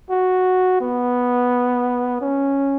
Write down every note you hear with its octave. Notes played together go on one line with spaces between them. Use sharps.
F#4
B3
C#4